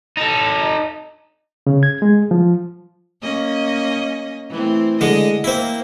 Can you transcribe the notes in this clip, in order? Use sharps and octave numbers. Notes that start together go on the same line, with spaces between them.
D#4 A4
C#3
G#6
G#3
F3
A#3 C#4 D#5
E3 A3 C4
D3 G#3 D#5
A#3 C4 E4